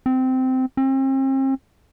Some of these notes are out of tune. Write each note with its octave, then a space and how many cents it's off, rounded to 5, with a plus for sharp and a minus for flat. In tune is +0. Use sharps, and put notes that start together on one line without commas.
C4 -15
C4 +40